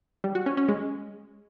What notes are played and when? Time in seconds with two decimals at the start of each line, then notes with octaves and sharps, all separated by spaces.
0.24 G3
0.35 F#4
0.46 C#4
0.57 C#4
0.68 G#3